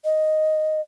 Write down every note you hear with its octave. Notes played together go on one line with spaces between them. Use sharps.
D#5